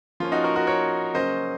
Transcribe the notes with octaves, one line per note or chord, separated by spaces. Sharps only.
F3 A#3 C#4 F4
D#4 F#4
F#4 A#4
F#4 A#4
A#4 C#5
C#3 F#3 A#3 C#4 C5 D#5